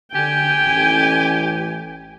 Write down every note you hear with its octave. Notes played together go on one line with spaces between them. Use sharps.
D3 G4 G5 G#5
A1